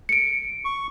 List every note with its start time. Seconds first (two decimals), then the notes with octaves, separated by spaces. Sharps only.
0.09 C#7 D7
0.65 C#6